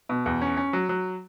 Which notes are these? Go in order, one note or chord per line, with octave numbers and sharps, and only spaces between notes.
B2
E2
C#4
C#4
F#3
F#3